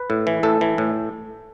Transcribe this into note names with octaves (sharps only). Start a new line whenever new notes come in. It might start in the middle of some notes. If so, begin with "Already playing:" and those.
Already playing: B4
A2
E3
A2 A4
E3
A2